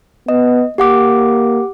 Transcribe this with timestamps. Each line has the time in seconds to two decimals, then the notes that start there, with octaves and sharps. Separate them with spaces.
0.29 B3 D#5
0.78 A#3 G4 F#5 D6